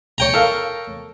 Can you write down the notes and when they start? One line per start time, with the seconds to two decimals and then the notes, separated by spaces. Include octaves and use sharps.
0.18 C#5 G5 A#5
0.34 A4 A#4 F5